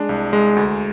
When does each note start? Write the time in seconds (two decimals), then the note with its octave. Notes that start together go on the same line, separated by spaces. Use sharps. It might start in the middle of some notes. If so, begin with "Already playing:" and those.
Already playing: G#3 D4
0.09 C2
0.33 G#3
0.56 D2